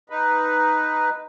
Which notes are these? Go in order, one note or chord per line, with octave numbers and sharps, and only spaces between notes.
D#4 B4